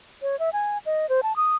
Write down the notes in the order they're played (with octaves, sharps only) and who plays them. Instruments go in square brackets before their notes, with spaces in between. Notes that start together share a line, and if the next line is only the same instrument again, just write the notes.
[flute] C#5
E5
G#5
D#5
C5
A5
D#6